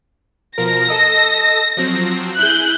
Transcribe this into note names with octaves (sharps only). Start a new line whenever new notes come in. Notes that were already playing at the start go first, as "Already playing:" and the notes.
B2 F3 A#4 A#6
A4 D#5 E6
F3 F#3 C4
E4 G#4 F#6 G6